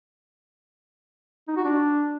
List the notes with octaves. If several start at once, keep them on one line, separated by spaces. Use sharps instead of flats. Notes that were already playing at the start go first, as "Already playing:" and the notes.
D#4
F#4
D4